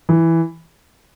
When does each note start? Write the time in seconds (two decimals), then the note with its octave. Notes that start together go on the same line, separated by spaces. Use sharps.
0.09 E3